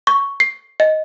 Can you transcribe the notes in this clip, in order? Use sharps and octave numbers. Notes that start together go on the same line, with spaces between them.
C#6
C7
D#5